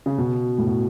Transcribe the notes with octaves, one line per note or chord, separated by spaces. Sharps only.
C#3
B2
A2
B2